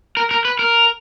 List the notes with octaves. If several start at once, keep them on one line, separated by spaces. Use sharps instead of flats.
A#4
A#4
B4
A#4